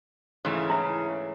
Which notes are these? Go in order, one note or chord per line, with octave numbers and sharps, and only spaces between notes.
G#2 C#3 E3 A3
E4 E5